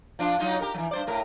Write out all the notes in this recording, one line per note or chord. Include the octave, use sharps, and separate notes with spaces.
F3 D4 F4
F#3 D#4 F4
G4 A#4
E3 F#3
G2 C5 D5
A2 A#4